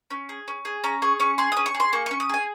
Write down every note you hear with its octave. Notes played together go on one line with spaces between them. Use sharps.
C#4
G#4
C#4
G#4
C#4 A#5
G#4 C#6
C#4 C#6
G#4 C6
C#4 D#6
C#6
G#4
C6
A#3 C#6
C#4 C#6
D#6
G#4 G#5